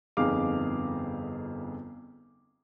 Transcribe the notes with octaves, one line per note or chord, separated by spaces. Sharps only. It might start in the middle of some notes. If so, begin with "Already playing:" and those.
G1 F2 D#4 G#4 F5 D6